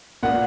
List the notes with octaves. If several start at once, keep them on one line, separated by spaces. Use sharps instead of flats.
A#2 F#5